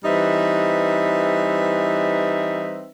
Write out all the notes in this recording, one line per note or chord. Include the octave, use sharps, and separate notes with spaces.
E3 G3 C4 D#4 B4 E5